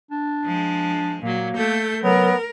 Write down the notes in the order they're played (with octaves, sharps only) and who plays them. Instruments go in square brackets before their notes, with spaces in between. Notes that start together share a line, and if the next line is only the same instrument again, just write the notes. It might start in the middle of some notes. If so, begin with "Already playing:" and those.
[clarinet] D4
[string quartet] F3 G#3
[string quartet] A#2 F#3 [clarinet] A#3
[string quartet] A3 A4 G6
[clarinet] F#3 [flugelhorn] B3 [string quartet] A#4